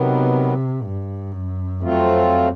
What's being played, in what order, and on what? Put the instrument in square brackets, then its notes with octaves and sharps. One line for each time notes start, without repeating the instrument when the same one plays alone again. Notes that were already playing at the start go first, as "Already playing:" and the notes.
Already playing: [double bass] C3 [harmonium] D#3 F#3 B3
[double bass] G2
F#2
[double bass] F2 [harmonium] F#3 A3 C4 F4